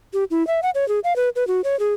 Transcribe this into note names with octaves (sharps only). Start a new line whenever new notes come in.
G4
E4
E5
F#5
C#5
G#4
F5
B4
B4
F#4
C#5
G#4